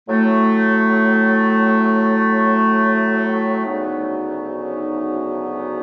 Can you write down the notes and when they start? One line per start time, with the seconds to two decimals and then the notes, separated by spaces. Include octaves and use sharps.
0.09 A2 F#3 A3
3.65 D2 C#3 F#3 B3 D#4